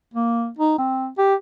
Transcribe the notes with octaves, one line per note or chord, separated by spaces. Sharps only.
A#3
D#4
C4
G4